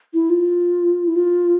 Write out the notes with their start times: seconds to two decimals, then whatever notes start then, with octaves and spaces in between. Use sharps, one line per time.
0.14 E4
0.30 F4
1.08 E4
1.16 F4